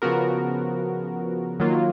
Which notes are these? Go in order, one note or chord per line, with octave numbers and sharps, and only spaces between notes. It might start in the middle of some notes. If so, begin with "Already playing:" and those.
C#3 F3 B3 F#4 A#4
D#3 F#3 A#3 F4